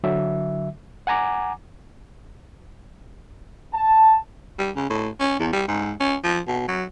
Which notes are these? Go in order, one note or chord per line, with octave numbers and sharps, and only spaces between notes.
D3 F#3 E5
F#5 G#5 A#5 D6
A5
G3
C#3
A2
C#4
E2
G3
G#2
C#4
F3
B2
F#3